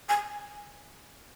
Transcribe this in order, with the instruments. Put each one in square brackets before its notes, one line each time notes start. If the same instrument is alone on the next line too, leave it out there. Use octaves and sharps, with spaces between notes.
[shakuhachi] G#5